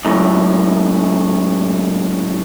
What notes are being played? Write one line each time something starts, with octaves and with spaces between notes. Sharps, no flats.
C#2 F#2 A2